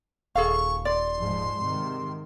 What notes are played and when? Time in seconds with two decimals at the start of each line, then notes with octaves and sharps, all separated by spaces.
0.35 D#1 G#4 A4 F5 C#6
0.85 D5 C6
1.19 G#2 F3 G#3
1.64 G#2 C3 D#3